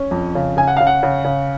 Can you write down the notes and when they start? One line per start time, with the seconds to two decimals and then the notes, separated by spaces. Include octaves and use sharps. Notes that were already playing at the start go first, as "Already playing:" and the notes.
Already playing: C#4
0.11 F2
0.35 C#3
0.57 C#3 G#5
0.68 F#5
0.77 C#3 F5
0.87 F#5
1.03 C#3
1.24 C#3